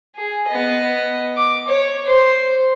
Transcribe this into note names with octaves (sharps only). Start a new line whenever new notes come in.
G#4
B3 D#5
D6
C#5
C5